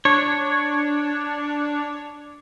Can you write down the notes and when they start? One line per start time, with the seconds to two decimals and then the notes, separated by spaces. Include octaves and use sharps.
0.05 D4 C#5